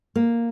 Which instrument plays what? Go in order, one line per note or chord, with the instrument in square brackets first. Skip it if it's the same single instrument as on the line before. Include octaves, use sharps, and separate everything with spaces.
[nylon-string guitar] A#3